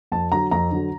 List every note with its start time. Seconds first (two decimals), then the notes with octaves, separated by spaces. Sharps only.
0.12 F2 A5
0.32 D3 F#3 A#5
0.51 F2 A#5
0.71 D3 F#3